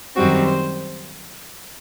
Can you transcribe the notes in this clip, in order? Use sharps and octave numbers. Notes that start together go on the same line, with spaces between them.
F#2 D#3 G3 C4 F#4
C5